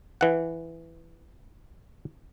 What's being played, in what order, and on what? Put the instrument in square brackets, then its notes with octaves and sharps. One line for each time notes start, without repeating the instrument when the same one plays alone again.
[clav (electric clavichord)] E3 F#5